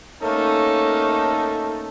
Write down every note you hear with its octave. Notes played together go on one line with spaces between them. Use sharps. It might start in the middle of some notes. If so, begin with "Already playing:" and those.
A3 A#3 C#4 D#4 A4